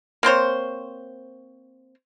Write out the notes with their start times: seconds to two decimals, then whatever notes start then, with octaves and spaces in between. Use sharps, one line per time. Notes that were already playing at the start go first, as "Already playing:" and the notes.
0.23 A#3 C4 C5 C#5